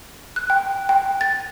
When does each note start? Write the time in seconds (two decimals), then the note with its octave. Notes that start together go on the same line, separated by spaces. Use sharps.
0.36 F#6
0.50 G5
0.89 G5
1.21 A6